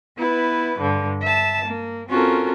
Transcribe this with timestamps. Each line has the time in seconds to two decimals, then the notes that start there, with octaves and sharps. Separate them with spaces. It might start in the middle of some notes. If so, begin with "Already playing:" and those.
0.16 B3 E4 B4
0.79 G2 D3
1.21 E5 A5
1.65 A#3
2.08 C4 C#4 F4 F#4 A4 A#4